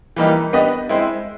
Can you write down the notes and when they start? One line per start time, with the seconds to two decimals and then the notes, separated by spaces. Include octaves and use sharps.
0.16 E3 G3 A#3 D#4 G4
0.53 B3 D4 G4 B4 D#5
0.89 G#3 C4 E4